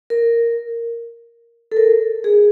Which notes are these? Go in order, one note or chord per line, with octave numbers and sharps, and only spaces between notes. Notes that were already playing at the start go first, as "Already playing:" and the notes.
A#4
A4
A#4
G#4